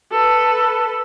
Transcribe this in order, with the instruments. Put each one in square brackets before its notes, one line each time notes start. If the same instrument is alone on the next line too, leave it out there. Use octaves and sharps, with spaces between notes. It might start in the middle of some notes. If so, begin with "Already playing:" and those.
[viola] A4 B4